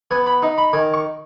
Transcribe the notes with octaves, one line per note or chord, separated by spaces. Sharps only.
B3 G#5
B5
D#4
B5
D#3 G#5
C#6